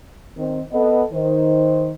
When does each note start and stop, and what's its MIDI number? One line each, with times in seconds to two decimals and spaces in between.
0.37 0.61 51
0.37 0.61 60
0.72 1.03 59
0.72 1.03 69
0.72 1.03 75
1.13 1.91 51
1.13 1.91 72